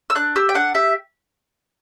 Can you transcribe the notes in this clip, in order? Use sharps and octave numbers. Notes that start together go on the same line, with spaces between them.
E6
D4 F#6
G4 E6
G5
D4 F#5
G4 E5